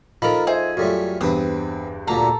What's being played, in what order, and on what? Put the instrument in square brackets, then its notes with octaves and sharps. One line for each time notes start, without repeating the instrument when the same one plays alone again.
[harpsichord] F3 D#4 A4 [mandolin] A#4 B5
[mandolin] G#4 [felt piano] C5 D#5 E5
[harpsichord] F#2 G3 A3 [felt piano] F4 A4 C#5
[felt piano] E2 G2 [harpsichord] C4 B4 [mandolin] D#6
[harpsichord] D2 A#2 D3 [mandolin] A4 A#5